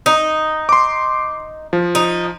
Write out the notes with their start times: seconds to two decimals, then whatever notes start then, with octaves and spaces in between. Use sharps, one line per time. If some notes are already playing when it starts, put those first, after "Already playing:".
0.06 D#4
0.69 C6 D6
1.73 F3
1.95 D#4